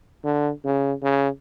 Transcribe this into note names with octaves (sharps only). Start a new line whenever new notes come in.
D3
C#3
C#3